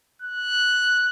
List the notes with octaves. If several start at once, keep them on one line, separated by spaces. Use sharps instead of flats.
F#6